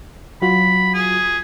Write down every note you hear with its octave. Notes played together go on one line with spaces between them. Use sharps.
F#3 F4 F#4 B5
G#4